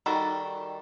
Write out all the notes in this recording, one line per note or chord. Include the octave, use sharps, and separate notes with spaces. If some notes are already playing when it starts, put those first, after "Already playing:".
D#3 G3 F#4 A4